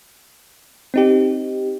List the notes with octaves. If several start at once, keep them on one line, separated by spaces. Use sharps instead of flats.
C4 D#4 G4